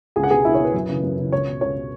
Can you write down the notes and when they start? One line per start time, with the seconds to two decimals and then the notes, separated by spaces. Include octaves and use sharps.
0.16 C#2 G#4 G#5
0.24 F#5
0.30 B2 G#4 G#5
0.45 C#2 E4 E5
0.55 C#5
0.59 B2
0.65 B4
0.74 F#2
0.89 C#3 E3
1.04 F#2
1.18 C#3 E3
1.32 C#2 C#5
1.47 B2
1.61 C#2 C#5
1.76 B2